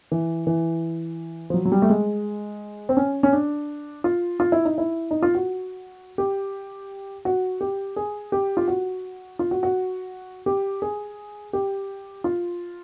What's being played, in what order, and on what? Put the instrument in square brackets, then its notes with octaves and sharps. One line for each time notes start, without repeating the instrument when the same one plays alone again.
[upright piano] E3
E3
F3
F#3
F#3
G3
A3
G#3
C4
C#4
C#4
D4
F4
F4
E4
D#4
E4
D#4
F4
F#4
G4
F#4
G4
G#4
G4
F4
F#4
F4
F#4
F#4
G4
G#4
G4
F4